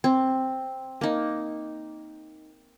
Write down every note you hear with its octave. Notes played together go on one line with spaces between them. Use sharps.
C4
A#3 D#4